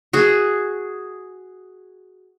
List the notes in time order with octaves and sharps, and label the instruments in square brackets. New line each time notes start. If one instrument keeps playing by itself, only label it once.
[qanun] F#4 G#4